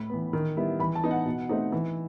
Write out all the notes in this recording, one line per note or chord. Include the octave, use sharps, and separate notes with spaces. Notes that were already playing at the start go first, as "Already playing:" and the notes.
Already playing: A2 B5
E3 B3
D#3
G3 B3 E4
E3 B5
A5
B3 D#4
F#5
B2
A3 C4 D#4
E3